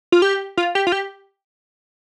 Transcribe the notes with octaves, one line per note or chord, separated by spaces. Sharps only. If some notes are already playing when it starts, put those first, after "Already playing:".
F4
G4
F4
G4
F4
G4